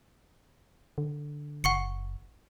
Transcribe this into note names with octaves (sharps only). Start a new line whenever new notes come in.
D3
F#1 F#5 C#6 C#7